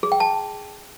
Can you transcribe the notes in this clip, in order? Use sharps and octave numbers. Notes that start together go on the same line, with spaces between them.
G#4
G5
A5